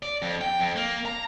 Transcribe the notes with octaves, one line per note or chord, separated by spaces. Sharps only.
D5
F2
G5
F2
A#3
A#5